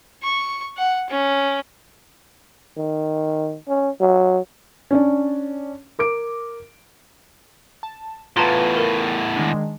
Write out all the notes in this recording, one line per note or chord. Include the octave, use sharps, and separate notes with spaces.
C#6
F#5
C#4
D#3
C#4
F#3
C#4 D4 D5
A#4 D6 D7
A5
E2 A2 F4 B4 F5 A5 A#5 C6
A#4
D#3 G#3 D4